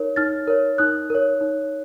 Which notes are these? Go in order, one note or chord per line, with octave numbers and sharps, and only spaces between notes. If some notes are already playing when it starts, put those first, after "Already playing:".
Already playing: D#4 A#4 C#5
D#4 F6 A6
A#4 C#5
D#4 D#6 F#6
A#4 C#5
D#4